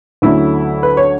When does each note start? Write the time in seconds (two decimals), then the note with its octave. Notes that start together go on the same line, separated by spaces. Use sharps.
0.22 D2 D3 F#3 A3 C#4 E4
0.83 B4
0.97 C#5